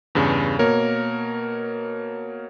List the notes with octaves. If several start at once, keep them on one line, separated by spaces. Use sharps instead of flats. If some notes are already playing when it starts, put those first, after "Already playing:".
E2 G2 C#3
B2 A#3 A#4 C#5